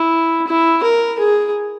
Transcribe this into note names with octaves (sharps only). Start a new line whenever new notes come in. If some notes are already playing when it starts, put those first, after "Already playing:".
Already playing: E4
E4
A#4
G#4